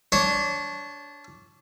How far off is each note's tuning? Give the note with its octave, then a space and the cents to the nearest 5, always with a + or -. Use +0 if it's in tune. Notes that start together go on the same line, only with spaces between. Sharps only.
D4 -15 C#5 +0